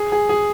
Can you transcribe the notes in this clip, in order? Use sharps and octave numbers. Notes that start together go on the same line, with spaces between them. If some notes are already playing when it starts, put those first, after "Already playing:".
Already playing: G#4
G#4
G#4